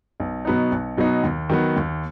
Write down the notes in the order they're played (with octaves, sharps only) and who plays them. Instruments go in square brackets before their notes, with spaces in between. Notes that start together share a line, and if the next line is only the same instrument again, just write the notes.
[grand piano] B1
B2 F#3 B3 D#4
B1
B2 F#3 B3 D#4
D#2
D#3 F#3 B3
D#2